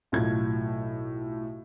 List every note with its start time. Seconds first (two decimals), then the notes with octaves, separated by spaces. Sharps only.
0.12 B1 A2 F4 G#6